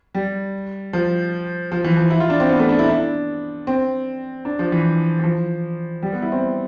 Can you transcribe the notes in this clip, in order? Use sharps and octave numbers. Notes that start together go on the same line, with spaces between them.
G3
F3
F3
E3
F3
E4
F4
D4
C4
B3
A3
D4
E4
D4
C4
D4
F3
E3
E3
F3
G3
B3
E4
C4